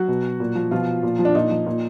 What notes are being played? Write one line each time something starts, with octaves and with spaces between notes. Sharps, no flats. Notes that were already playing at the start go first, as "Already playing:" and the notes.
Already playing: F#3 F#4
B2
A#2
F3
B2 F3 F4
A#2
F3
D4
A#2 D#4
F3
A#2